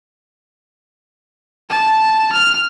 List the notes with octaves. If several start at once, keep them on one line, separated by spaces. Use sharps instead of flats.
A5
F6